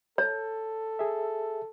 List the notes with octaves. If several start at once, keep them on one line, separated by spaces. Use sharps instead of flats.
A4 C#5
G#4 E5